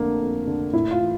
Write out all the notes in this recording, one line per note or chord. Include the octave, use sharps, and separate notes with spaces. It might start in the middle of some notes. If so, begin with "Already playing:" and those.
Already playing: F2 D3 A3 A#3
F2
D3
A2 E4
F4
E3